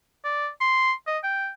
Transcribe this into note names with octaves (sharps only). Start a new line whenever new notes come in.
D5
C6
D#5
G5